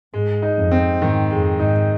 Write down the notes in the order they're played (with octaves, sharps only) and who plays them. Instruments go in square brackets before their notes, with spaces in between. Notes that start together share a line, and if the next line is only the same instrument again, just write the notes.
[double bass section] G#2 [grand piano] G#3
[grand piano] D#4
[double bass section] F2
[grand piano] C4
[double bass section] G#2 [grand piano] D#3
[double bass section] F2 [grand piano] G#3
[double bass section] G#2 [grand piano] D#4